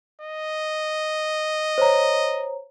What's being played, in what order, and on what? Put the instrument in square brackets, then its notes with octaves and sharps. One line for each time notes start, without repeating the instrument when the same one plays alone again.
[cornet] D#5
[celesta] C5 C#5 A#5